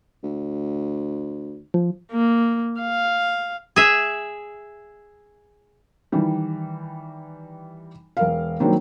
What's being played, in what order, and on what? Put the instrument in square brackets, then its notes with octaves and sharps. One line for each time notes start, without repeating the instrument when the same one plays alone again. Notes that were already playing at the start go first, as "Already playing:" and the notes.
[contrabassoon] D2
[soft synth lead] F3
[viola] A#3
F5
[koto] G#4 E5
[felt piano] D#3 E3 G3
E1 A#4 F5
D#3 F#3 G3 A#3 C4 D4